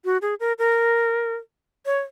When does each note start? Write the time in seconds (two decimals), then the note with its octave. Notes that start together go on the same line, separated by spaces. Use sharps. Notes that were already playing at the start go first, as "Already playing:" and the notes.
0.05 F#4
0.22 G#4
0.40 A#4
0.59 A#4
1.86 C#5